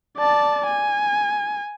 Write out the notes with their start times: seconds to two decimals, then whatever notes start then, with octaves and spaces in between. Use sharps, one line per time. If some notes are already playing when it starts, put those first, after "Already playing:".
0.18 D5 A5
0.67 G#5